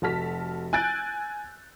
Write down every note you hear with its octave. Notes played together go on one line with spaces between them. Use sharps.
F1 F#4 A4 A5 F6 B6
G#5 E6 F#6 G6 A6 D7